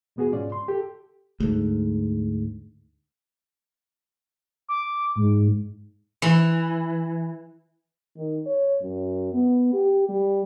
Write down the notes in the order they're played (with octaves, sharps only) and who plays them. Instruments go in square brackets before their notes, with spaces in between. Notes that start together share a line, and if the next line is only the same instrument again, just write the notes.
[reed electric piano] E2 B2 B3 F#4 G#4
G#2 C#4 F4 D5
C6
G4 A4
[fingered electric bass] D2 G#2
[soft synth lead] D6
G#2
[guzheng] E3
[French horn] D#3
C#5
F#2
B3
G4
G3